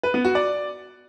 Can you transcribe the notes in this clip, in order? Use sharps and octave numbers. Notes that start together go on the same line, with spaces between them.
B4
B3
F#4
D5